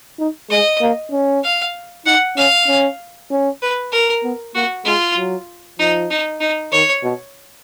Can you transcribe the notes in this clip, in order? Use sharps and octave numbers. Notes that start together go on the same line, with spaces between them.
D#4
G#3 D#5
A#3
C#4
F5
D#4 F#5
C#4 F5
C#4
C#4
B4
A#4
B3
A#3 F#4
G#3 F4
F#3
F3 D#4
D#4
D#4
D#3 C#5
B2